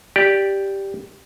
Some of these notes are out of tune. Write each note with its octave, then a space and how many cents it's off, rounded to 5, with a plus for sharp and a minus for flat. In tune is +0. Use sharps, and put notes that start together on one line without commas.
G4 +0 D5 +0